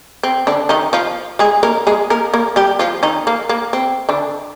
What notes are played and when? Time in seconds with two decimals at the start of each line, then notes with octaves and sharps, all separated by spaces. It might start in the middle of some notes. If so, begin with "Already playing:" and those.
0.23 C4
0.47 D3 D4
0.69 D#3 D#4
0.93 F3 F4
1.39 G#3 G#4
1.63 A#3 A#4
1.87 G#3 G#4
2.10 A#3 A#4
2.34 A#3 A#4
2.56 G3 G4
2.79 F3 F4
3.03 D#3 D#4
3.27 A#3
3.49 A#3
3.73 C4
4.09 D3 D4